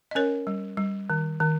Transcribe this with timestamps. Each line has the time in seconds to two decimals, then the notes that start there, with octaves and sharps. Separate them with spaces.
0.11 D#5
0.15 C#4 A#4 C#5
0.47 G3
0.77 G3
1.10 D#3
1.40 D#3